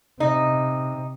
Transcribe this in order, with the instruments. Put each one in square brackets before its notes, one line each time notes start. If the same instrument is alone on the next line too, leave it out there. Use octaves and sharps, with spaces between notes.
[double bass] C3 [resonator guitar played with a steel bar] D#4